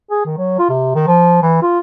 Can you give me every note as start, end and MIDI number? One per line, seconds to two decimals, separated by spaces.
0.11 0.25 68
0.25 0.34 51
0.38 0.58 54
0.59 0.69 65
0.70 0.93 48
0.95 1.03 51
1.07 1.40 53
1.42 1.59 52
1.62 1.79 65